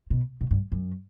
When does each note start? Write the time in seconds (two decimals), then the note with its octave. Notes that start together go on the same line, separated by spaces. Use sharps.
0.10 B2
0.41 B2
0.51 G2
0.72 F#2